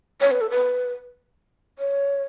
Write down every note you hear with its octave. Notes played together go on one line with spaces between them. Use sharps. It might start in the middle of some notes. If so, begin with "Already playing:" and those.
C#5
B4
A4
B4
C#5